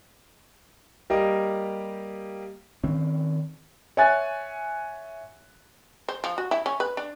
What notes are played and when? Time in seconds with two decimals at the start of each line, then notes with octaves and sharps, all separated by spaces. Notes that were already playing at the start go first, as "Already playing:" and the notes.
1.10 G3 A#3 G4 D#5
2.84 D#3 C4 C#4
3.97 C#5 E5 F#5 G#5 F#6 A6
6.08 C5
6.24 F3
6.38 F#4
6.51 E4
6.66 C#4
6.80 B4
6.97 D4